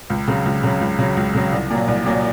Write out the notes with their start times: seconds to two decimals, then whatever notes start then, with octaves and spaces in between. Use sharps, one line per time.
0.10 C#2
0.28 C#3 F#3
0.45 C#2
0.64 C#3 F#3
0.81 C#2
0.99 C#3 F#3
1.17 C#2
1.35 C#3 F#3
1.52 C2
1.70 A#2 F#3
1.88 C2
2.06 A#2 F#3